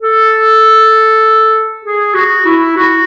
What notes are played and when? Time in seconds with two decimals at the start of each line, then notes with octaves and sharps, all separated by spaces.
0.01 A4
1.85 G#4
2.14 F#4
2.45 E4
2.77 F#4